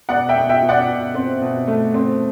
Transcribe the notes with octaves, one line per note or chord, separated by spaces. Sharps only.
B2 D5 F#5
E5 G5
B2
E5 G5
B2
D5 F#5
B2
C4
B2
A3
C4